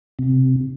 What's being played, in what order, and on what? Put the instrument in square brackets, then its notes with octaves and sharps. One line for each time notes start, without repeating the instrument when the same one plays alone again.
[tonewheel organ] C3